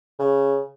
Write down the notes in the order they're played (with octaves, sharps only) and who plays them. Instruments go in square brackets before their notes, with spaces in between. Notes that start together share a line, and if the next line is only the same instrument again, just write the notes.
[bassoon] C#3